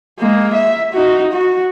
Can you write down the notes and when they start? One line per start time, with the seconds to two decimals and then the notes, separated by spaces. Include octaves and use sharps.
0.19 G#3 A#3
0.54 E5
0.93 D#4 F#4
1.32 F#4